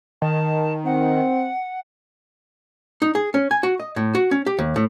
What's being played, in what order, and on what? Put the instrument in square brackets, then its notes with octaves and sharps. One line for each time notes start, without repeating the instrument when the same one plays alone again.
[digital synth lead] D#3 [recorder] A5
[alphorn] C4 [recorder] F#5
[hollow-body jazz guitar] D#4
G#4
C#4
G#5
F#4
D#5
A2
F#4
C#4
G4
D#2
A2